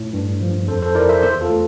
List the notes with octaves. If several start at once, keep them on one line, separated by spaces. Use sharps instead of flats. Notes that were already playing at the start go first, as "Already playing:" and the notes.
Already playing: A2
G2
F3
F2 A4 C5
A4 C5
E4 A#4 D5
C5 E5
E2 C5 E5
F4 A4
A3